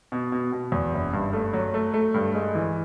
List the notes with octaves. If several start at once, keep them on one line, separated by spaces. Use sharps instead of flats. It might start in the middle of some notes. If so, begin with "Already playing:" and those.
B2
B2
B2
E2
F#1
G2
A3
F#3
A3
A3
G2
G#3
E3